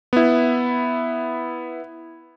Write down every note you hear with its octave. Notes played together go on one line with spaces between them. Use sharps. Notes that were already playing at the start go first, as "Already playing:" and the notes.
B3 E4